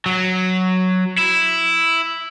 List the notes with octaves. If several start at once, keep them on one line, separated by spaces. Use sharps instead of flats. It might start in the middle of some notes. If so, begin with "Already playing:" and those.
F#3
E4